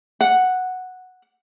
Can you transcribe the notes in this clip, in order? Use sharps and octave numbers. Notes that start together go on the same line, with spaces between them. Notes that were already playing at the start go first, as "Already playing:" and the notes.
F#5